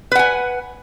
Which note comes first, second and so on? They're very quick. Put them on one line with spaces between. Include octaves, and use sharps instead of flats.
B4 F#5 G#5